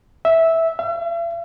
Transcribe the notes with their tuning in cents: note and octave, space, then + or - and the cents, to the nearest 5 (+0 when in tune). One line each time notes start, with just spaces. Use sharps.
E5 -10
E5 +45